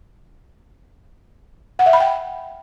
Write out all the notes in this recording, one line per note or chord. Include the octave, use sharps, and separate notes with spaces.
F#5
E5
B5
G5